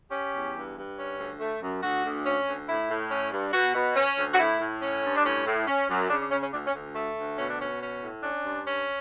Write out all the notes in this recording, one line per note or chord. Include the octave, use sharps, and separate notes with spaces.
C#4 G4
E2
G2
G2
C#4
D2
A3
F#2
D2 F#4
D2
C#4
D2
A2 E4
A2
C#4
G2
B2 F#4
B2
C#4
D2
F#4
A2 E4
A2
C#4
G2
D4
A2 C#4
A2
C#4
F#2
C#3 D4
D4
C#3 C#4
C#4
D2 D4
C#4
D2
A3
D2
B2 C#4
D4
B2 C#4
C#4
A2
C#4 D4
G2
C#4